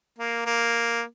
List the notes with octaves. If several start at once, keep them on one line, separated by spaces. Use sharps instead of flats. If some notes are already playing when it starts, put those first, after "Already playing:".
A#3
A#3